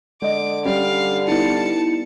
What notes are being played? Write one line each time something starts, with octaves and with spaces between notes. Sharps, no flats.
D3 G#3 D#5 D6
G3 C#4 F5
B3 D#4 E4 A5 C#7